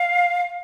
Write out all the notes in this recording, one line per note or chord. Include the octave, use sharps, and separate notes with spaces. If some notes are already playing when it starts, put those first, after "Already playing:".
Already playing: F5